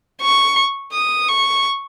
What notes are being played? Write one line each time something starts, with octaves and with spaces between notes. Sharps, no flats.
C#6
D#6
C#6